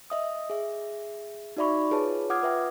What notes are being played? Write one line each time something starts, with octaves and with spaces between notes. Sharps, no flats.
D#5 E5 D#6
G#4 E5
D#4 F#4 D5 E5 B5 C#6
F4 G#4 B4 C#5 A5
F4 F#5 D6 D#6 F6 G#6
B4 E5 G5